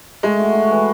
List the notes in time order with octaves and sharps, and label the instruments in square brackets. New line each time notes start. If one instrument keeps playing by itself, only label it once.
[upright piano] G#3 [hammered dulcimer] A3
[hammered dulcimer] F#4
F#4
E3